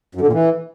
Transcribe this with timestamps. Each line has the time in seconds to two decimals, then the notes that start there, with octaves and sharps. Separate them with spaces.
0.15 F#2
0.21 D3
0.27 A#2
0.33 E3